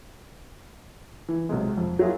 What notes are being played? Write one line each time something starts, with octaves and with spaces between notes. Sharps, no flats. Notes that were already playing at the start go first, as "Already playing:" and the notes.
E3
B1 C3 G#3
F2
F#3 A#3 E4 F4 G#4